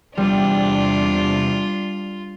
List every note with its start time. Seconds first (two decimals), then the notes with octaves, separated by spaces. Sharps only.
0.17 E2 C3 G3 D4 F4